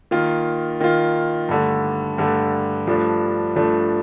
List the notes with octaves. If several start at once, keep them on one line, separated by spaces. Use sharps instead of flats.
D#3 A#3 F4
D#3 A#3 F4
G2 D3 A3
G2 D3 A3
G2 F3 A3 D4
G2 F3 A3 D4